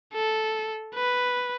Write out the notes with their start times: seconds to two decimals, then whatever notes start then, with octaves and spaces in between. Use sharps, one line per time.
0.14 A4
0.95 B4